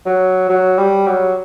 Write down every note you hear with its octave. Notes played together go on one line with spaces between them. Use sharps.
F#3
F#3
G3
F#3